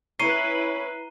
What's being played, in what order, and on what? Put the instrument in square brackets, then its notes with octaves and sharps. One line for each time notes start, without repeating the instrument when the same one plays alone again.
[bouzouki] C#4 [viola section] E4 B4 [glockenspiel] A#5 D#7 G7 [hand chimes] C7